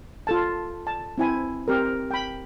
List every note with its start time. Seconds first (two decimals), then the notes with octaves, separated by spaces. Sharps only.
0.27 F4 A4 A5
0.87 A5
1.18 C4 E4 G#5
1.68 C4 G4 A#4
2.11 G5 B5